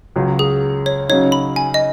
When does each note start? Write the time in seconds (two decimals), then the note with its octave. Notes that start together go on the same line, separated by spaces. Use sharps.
0.16 C#2 C#3 F#3
0.39 G#4
0.86 C#5
1.09 C#3 F#3 D#4 C#5
1.32 B5
1.56 G#5
1.74 D#5